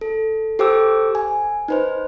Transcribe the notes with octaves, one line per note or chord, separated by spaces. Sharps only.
A4
G4 A4 C5 G5 D6 E6
G#5
D#4 B4 C5